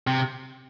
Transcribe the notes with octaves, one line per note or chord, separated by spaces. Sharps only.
C3